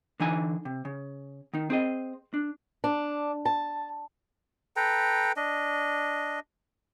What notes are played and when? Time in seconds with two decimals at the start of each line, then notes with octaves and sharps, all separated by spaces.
0.20 D3 E3 D#4 G#5
0.65 C3
0.85 C#3
1.54 D#3 D#4
1.70 C4 G#4 D#5
2.34 D4
2.84 D4
3.45 A5
4.76 A4 B4 G5 A#5
5.36 D4 D#5